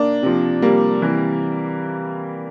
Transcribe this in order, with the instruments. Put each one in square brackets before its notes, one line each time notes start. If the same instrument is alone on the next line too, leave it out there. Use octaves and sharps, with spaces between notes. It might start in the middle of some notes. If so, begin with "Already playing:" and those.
Already playing: [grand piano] A#3 D4
C3 F3
G3 A#3
C3 E3